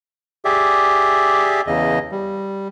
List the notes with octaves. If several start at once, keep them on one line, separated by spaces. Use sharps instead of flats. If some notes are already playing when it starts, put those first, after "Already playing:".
G4 G#4 D5 E5
E2 C#3 D#5
G3